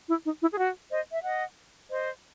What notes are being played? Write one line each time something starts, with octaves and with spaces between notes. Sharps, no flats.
E4
D#4
E4
G#4
F#4
C5 D#5
E5
D#5 F#5
C5 D#5